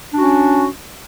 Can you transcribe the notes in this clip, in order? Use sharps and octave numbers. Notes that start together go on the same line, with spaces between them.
C#4 D4 F#4